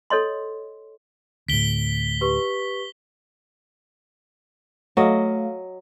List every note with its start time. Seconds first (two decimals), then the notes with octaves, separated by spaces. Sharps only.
0.10 A4 C#5 D#5 C6
1.48 D2 A2 B6 D7 G7
2.21 G4 B4 C#6
4.97 F#3 A3 D#5 F5